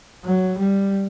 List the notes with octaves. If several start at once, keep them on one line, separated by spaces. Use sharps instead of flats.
F#3
G3